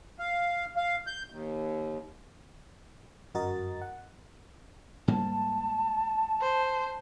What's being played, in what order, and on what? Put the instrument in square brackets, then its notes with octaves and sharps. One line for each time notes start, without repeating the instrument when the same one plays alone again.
[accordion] F5
F5
G6
D#2
[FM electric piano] G1 F#2 F#4 A#4 D#5 A6
F#5
[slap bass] G#2 G3 A#3 [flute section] A5
[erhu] C5